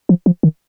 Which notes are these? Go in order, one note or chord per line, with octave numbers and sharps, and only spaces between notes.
F3
F3
D#3